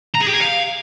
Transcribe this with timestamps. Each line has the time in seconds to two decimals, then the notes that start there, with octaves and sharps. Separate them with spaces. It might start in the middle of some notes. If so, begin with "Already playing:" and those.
0.15 A#5
0.21 G#4
0.28 G4
0.34 G#5
0.40 F5